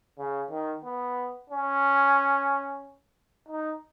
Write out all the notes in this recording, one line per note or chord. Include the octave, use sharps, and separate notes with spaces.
C#3
D#3
B3
C#4
D#4